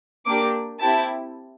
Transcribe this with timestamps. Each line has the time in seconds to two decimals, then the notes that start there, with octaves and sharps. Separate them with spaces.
0.26 A#3 D4 G4 D6
0.80 C4 E4 G4 A5